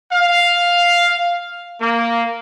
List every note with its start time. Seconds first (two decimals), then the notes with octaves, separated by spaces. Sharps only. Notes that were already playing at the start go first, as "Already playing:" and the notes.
0.13 F5
1.81 A#3